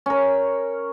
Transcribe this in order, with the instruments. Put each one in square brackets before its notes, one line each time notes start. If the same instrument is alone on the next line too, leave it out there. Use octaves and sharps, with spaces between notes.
[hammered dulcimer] C#4 A#4